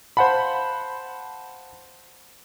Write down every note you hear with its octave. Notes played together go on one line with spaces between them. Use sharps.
C5 F5 F#5 A5 B5